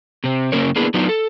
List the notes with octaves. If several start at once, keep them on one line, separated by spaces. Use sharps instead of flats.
C3 C4
F#2 C#3 A#3 C#4 A#4 C#5
A#3 B3 D4 E4 G#4 B4
F#3 B3 D4 D#4 F4 F#4
A4